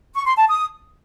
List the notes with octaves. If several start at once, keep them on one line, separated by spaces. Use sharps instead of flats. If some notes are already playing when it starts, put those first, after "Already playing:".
C#6
C6
A5
D#6